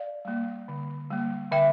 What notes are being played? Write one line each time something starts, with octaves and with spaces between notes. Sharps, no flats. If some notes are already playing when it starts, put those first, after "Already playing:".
Already playing: D5 F5
G3 A#3
D3
G3 A#3
D3 E5 G5